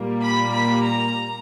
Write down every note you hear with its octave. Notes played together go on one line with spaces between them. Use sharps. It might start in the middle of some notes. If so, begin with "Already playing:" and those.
Already playing: A#2 G3 A#3
B5
B5
A#5